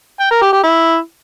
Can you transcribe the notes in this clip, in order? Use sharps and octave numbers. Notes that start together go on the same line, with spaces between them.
G5
A#4
G4
G4
E4